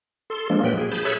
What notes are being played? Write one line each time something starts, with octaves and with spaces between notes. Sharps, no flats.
A4 C6
F3 G#3 A#3 D4
A#2 F#3 B4 G5
G#4
G#4 A5 B5 G6
G#4 A4 C#5 E5 B5 F#6